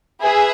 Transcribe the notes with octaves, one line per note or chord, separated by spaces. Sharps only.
G#4 B4 E5